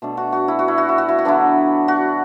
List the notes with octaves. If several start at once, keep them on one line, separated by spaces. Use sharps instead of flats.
B2 A3 D4
F#4
F#4
E4
F#4
E4
F#4
E4
F#4
E4
F#4
D3 F#3 B3 D4 E4
F#4